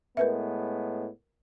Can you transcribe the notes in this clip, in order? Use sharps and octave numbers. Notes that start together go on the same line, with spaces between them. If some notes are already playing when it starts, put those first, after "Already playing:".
A2 G#3 B3 A#4 B4 E5